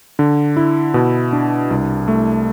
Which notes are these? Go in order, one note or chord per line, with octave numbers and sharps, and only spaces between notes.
D3
E4
B2
D4
C2
A3